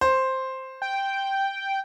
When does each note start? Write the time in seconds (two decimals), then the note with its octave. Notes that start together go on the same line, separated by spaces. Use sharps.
0.01 C5
0.82 G5